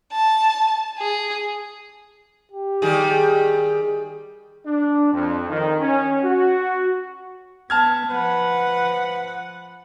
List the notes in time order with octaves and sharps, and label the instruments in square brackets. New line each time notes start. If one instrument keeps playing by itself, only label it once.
[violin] A5
G#4
[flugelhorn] G4
[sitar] D#3 G3 G#4
[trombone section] D4
F2
D#3
C#4
F#4
[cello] B3 [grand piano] A5 F6 G#6
[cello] F3 F#5 [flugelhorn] B4